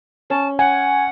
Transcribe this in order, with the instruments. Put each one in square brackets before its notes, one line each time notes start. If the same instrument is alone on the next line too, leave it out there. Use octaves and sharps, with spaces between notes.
[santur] C#4 [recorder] A5
[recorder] F#5 [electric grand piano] G#5